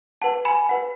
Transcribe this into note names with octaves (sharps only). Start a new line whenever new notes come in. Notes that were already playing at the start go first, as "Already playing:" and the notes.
B4 F#5 A5
G#5 B5
B4 F#5